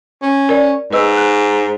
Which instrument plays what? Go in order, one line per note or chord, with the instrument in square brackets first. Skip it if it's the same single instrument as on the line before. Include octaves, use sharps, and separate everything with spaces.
[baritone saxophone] C#4
[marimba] A#4 D5
[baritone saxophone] G#2 [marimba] B4 D#5 E6
[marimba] F#6